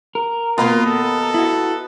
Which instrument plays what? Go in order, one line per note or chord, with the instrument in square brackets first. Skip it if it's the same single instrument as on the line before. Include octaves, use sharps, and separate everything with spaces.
[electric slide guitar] A#4
[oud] D#2 B2 A#3 [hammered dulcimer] B3 D#5 A#5 [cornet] F4
[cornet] A4
[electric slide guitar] E4 F#4